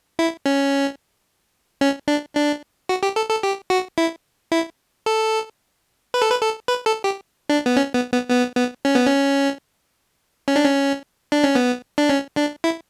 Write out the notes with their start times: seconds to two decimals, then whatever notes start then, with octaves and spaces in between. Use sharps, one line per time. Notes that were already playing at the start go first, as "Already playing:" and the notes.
0.19 E4
0.46 C#4
1.81 C#4
2.08 D4
2.35 D4
2.89 F#4
3.03 G4
3.16 A4
3.30 A4
3.43 G4
3.70 F#4
3.98 E4
4.52 E4
5.06 A4
6.14 B4
6.22 A4
6.30 B4
6.41 A4
6.68 B4
6.86 A4
7.04 G4
7.49 D4
7.66 B3
7.76 C#4
7.95 B3
8.12 B3
8.30 B3
8.56 B3
8.85 C#4
8.95 B3
9.06 C#4
10.48 C#4
10.56 D4
10.65 C#4
11.32 D4
11.44 C#4
11.55 B3
11.98 D4
12.10 C#4
12.37 D4
12.64 E4